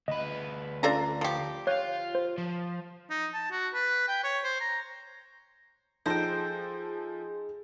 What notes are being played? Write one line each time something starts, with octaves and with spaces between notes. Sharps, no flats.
D2 B4 D#5
C#4 D4 F4 A4 D5 A#5
F3 G4
F4 C#5 F5 F#6 G6
C5
F3
D#4
A5
F#4
B4
G5
C#5
C5
A#5
F3 D#4 G#4 A4 C5 G5 A5 A#6